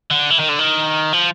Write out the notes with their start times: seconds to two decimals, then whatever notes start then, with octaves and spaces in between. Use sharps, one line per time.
0.11 D3
0.31 E3
0.40 D#3
0.49 D3
0.59 D#3
1.13 F3